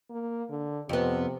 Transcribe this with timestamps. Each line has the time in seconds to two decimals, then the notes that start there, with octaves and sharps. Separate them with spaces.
0.10 A#3
0.50 D3
0.89 F2 C3 B3